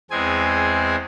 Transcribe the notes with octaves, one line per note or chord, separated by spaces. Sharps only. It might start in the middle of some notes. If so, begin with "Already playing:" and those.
E2 G#3 C4 G#4 G#5